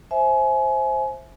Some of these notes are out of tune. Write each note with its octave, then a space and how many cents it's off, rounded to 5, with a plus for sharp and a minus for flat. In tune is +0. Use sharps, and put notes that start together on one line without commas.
C5 +10 E5 +0 G#5 +30